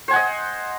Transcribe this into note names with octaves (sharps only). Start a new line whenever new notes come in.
C5 D#5 F#5 G#5